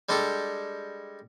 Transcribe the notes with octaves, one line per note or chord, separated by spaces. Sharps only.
G3 G#3 D4 G4 A4